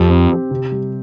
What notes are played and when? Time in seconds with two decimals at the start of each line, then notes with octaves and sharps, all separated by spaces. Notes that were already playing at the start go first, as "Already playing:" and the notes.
Already playing: F2 F3 G4
0.09 C4
0.30 G4
0.51 C3
0.72 G3